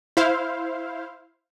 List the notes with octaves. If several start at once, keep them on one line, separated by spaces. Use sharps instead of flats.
E4 C5 F5